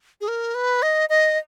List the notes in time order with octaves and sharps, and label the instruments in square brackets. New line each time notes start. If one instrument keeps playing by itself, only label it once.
[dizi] G#4
A#4
B4
D#5
D#5